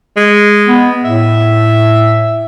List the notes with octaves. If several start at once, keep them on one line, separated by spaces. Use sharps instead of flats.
G#3
B3
A2 E5